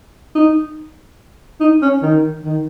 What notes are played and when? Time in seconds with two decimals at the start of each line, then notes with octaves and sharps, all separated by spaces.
0.35 D#4
1.60 D#4
1.82 C#4
2.02 D#3
2.44 D#3